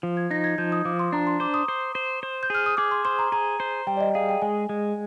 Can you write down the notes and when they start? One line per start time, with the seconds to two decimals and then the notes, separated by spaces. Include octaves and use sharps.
0.03 F3
0.17 G#6
0.31 D#4 A#6
0.44 G#6
0.58 F3 G6
0.72 D#6
0.85 F3 D6
0.99 C6
1.12 D4 A#5
1.27 C6
1.40 C5 D6
1.54 D#6
1.68 C5
1.95 C5
2.23 C5
2.43 G6
2.50 G#4 F6
2.66 D#6
2.77 G#4 D6
2.91 C6
3.05 C5 C6
3.19 A#5
3.32 G#4 A#5
3.60 C5
3.87 G3 G5
3.97 D5
4.01 D#5
4.15 G#4 F5
4.29 G5
4.42 G#3 G#5
4.69 G#3